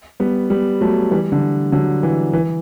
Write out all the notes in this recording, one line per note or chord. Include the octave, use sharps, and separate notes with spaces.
G3 B3
G3 B3
F#3 A3
E3 G3
D3
D3 F#3
E3
E3